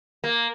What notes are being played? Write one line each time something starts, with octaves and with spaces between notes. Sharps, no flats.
A#3